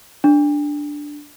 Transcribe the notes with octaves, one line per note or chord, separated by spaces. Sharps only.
D4